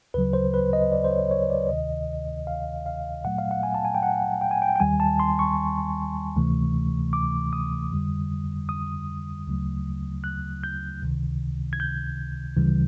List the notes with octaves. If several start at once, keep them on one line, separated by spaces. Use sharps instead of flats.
D2 C#3 F#3 B4
C5
B4
D#5
D5
C5
C#5
C#5
D5
D2 C3 D#3 D#5
F5
F5
A#2 F#3 A3 F#5
F5
F#5
G#5
A5
G#5
G5
F#5
G5
G#5
G5
G5
D#2 D#3 G3 G#5
A5
C6
C#6
D2 C3 E3 A3
D6
D#6
F2 D3 G3
D#6
D2 C#3 F#3 A3
F#6
G6
C#2 C3 D#3
G#6
G6
D2 C#3 E3 G3